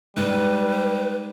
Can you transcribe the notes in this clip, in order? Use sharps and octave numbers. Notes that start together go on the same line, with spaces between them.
G#2 G3 B4